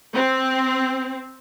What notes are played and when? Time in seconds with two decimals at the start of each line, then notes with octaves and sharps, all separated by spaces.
0.14 C4